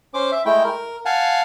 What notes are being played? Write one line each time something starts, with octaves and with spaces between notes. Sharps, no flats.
C#4 C5 D6
E5
G#3 A3 E4 G5
A#4
F5 F#5 G#5 A5